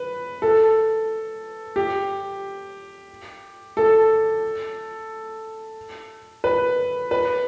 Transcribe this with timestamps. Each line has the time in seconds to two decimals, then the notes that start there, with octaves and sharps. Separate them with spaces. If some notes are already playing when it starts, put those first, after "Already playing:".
Already playing: B4
0.42 A4
1.76 G4
3.77 A4
6.44 B4
7.11 B4